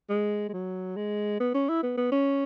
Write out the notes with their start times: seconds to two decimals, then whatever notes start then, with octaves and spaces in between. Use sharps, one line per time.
0.10 G#3
0.49 G#3
0.53 F#3
0.96 G#3
1.40 B3
1.54 C#4
1.69 E4
1.83 B3
1.97 B3
2.12 C#4